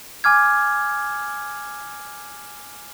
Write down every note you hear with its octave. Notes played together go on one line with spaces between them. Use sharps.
G#5 D6 F6 G#6